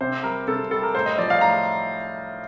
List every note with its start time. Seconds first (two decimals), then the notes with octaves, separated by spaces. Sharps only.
0.01 C3 C5
0.23 G3 A#4
0.47 C3 A4
0.71 G3 A4
0.83 A#4
0.94 A2 C5
1.06 D#5
1.18 F3 D5
1.30 F5
1.41 A2 A#5